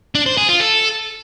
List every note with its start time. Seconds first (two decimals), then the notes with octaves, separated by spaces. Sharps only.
0.15 D4
0.26 C5
0.38 G#4
0.49 F4
0.60 A4